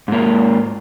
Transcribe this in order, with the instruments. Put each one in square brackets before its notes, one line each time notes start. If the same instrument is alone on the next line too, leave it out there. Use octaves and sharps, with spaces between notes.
[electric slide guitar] G#2 A#3